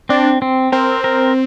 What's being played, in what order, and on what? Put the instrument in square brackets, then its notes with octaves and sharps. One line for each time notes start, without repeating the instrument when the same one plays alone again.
[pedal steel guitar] C4 [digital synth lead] D4
[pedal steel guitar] C4
[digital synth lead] C4 [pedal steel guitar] A#4
[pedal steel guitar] A#4